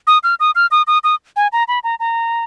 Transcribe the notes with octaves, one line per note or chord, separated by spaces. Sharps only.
D#6
F6
D#6
F6
D#6
D#6
D#6
G#5
A#5
B5
A#5
A#5